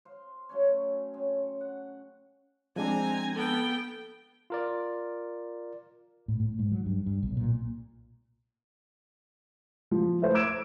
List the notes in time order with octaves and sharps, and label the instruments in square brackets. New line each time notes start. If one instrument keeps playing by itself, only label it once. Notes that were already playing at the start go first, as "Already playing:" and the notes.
[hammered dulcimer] C5 F5
F#3 A3 C#4 C#5
C#3 C4
C#6
F#5
[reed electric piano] F3 G#3 D4 [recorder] C4 [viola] G#5 A#5
[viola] B3 G5 [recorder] A4
[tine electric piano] F4 A#4 D5
[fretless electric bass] A2
A2
G#2
F#3
G2
G2
B1
A#2
[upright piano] F3
A3 E4 C5
D6 E6 G#6 D7 E7